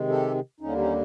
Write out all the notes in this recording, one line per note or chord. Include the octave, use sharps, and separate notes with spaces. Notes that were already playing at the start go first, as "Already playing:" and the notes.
Already playing: C3 D#3 G#3
G4 A4
D#2 D3 G3 A#3 C#4 D#4
C#4 D#4